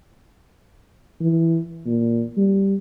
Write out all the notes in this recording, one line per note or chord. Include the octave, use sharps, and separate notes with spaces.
E3
A#2
G3